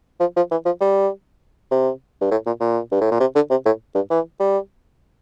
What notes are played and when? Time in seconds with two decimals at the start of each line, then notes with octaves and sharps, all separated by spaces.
0.20 F3
0.37 F3
0.51 E3
0.65 F3
0.81 G3
1.71 C3
2.21 G2
2.31 A2
2.46 A#2
2.61 A#2
2.91 G2
3.01 A2
3.11 A#2
3.20 C3
3.35 D3
3.50 C3
3.66 A2
3.95 G2
4.10 E3
4.40 G3